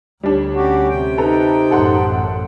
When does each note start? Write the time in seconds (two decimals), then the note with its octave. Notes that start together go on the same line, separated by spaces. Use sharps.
0.23 D2 G3 D4 C#5
0.54 C#4 F#4 G4
0.89 C3 G5
1.18 D#4 A4 B4 A#5
1.71 A1 F#2 A4 F#5 C6